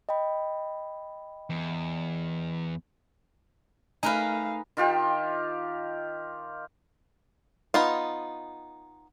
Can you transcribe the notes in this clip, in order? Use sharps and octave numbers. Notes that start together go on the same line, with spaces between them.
D#5 G5 B5
E2
A3 D#4 A#4 B4 F5 G#5
D#3 F4 G4
B3 D#4 F4